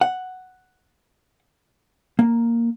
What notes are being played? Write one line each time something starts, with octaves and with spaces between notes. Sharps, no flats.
F#5
A#3